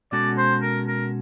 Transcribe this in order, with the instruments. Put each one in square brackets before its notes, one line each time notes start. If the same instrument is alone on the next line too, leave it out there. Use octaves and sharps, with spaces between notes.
[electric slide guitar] B2 G#3 C#4 F#4 A4 [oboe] D5
[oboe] C5
A#4
A#4